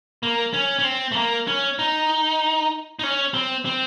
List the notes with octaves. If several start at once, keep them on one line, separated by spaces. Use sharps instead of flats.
A#3
C#4
C#4
C4
A3
A#3
C#4
D#4
D#4
C#4
C4
C4